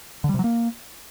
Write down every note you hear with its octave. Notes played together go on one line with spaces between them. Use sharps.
D3
G3
C3
F#3
A#3